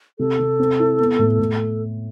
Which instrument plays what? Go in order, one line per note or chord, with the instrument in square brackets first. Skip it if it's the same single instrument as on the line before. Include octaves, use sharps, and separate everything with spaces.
[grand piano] C3 [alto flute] A4
[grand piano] C3
C4
E4
B3
A2
A2